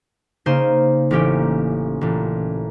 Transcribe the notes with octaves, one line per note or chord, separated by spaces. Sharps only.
C#3 A#3 D#4 C5 D#7
A1 A#3 C#4 G4
A1 A#2